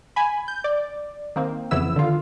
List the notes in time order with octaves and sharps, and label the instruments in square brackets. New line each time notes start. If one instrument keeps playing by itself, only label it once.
[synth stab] G#5 B5
G6
D5
D#3 A#3 C4
F2 C#3 E3 B3 E4 E6
D3 D#3 F4